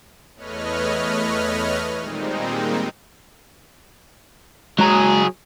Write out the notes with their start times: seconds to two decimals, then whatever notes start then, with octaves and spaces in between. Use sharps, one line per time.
0.35 E2 A3 B4 C#5 D#5 F6
1.99 A#2 D#3 G3 G#3 C4 D#4
4.79 F#3 G#3 F#4 G#4 A#5